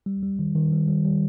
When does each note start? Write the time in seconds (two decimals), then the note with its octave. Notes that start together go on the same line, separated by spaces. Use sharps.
0.06 G3
0.22 G3
0.39 D#3
0.55 D#3
0.72 G3
0.88 G3
1.05 G3